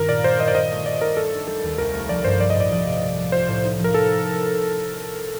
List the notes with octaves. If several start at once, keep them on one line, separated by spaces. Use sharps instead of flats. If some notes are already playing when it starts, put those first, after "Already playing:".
Already playing: G2 D#3 A#4
A#2 D5
G3 C5
G3 D#5
D5
A#2 D#5
A3
A3 D5
D#4 A#4
A3 A4
D4
G3 A4
D#2
C2 A#4
A3
F3 D5
G2 C5
G3 D5
D#5
A2 D5
F3
C3
C3
F3
F4 C5
A2
D#4
F3
A#4
A4